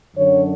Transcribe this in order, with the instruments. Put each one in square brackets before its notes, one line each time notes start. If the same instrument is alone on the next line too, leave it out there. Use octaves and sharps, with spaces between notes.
[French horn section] F#2 D3 F#3 C#5